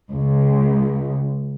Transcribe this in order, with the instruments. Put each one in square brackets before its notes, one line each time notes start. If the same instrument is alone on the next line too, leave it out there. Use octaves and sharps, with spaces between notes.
[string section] C#2